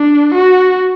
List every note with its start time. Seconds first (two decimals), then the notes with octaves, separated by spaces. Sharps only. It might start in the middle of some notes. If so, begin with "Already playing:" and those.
Already playing: D4
0.34 F#4